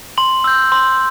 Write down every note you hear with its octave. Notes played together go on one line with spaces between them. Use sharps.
C6 F#7
E6 G6
C6